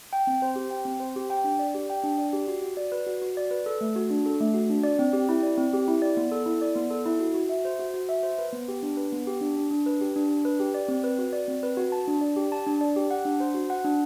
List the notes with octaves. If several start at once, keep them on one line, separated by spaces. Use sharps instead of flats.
G5
C4
C5
G4
G5
C4
C5
G4
G5
D4
D5
G4
G5
D4
D5
G4
F#4
F#4
D5
B4
F#4
F#4
D5
B4
A4
A3
F#4
D4
A4
A3
F#4
D4
D5
C4
G4
E4
D5
C4
G4
E4
D5
B3
A4
E4
D5
B3
A4
E4
F#4
F#4
E5
C5
F#4
F#4
E5
C5
B4
B3
G4
D4
B4
B3
G4
D4
D4
D4
B4
G4
D4
D4
B4
G4
D5
C4
B4
F#4
D5
C4
B4
F#4
A5
D4
D5
G4
A5
D4
D5
G4
F#5
D4
C5
F#4
F#5
D4